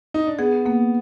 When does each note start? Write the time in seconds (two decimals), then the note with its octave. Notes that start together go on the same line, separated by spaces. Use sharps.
0.14 D#4
0.27 D4
0.39 B3 G#4
0.65 A#3 B3